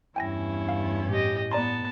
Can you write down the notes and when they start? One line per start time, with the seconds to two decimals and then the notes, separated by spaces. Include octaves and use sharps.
0.16 E2 G2 C#4 E4 G5 G#5 A#6
0.68 F5
1.09 A2 G4 D#5
1.51 B3 D5 A5 A#5 C6